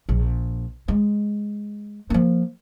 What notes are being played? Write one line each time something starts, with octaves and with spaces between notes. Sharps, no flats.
A#1
G#3
F3 A#3